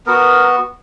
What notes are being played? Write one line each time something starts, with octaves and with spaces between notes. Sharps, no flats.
B3 F#4 A#4